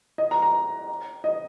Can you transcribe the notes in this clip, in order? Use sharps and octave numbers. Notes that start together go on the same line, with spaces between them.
D#5
A#5
A#5
D#5